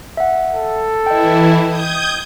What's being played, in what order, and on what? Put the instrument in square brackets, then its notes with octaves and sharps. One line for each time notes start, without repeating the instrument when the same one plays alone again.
[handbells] E5 F#5
[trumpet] A4
[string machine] E3 E4 [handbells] D#5 G5
[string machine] D#6 G6 G#6